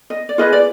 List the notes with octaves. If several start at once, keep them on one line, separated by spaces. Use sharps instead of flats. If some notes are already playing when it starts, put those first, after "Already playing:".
D#5
D5
F4 G#4 B4 D#5
D5